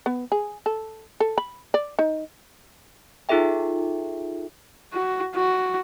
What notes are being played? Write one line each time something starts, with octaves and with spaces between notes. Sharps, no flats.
B3
G#4
A4
A4
B5
D5
D#4
D#4 F4 G#4 A4 E5 G5
F#4
F#4